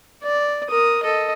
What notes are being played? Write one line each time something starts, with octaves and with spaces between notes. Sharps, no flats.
D5
A#4 D#6
A4 D#5